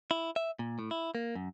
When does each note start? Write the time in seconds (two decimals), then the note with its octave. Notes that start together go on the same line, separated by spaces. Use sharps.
0.11 E4
0.36 E5
0.59 A#2
0.79 A2
0.91 E4
1.15 A#3
1.35 F#2